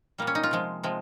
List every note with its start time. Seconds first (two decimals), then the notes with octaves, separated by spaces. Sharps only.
0.18 A#2 G3 A#3
0.27 C#4
0.35 D#4
0.43 F4
0.51 C3 F3 G#3
0.83 C3 F3 G#3